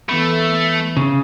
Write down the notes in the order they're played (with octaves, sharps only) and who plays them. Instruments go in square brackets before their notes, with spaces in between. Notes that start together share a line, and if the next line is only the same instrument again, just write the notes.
[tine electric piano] E3 B3 B5 [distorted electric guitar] A3
[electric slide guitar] C#3